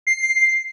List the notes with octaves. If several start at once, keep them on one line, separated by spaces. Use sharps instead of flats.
C7